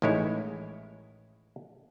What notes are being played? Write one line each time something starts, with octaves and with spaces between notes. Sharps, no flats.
A1 D#3 G#3 E4 C#5